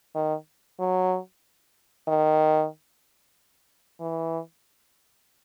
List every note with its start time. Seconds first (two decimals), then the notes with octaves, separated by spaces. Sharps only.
0.15 D#3
0.79 F#3
2.08 D#3
4.00 E3